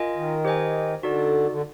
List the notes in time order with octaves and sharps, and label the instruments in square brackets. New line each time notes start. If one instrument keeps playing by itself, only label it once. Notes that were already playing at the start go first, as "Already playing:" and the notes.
Already playing: [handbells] F4 A#4 D#5 G#5
[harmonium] D#3
[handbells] G4 C5 D#5 G#5
[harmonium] D3 [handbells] D#4 F#4 A4 D5
[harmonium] D3